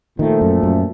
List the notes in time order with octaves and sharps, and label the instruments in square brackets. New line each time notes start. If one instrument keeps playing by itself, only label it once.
[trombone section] A#2 F3 A3 [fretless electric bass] D#3
[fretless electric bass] F#2
F#2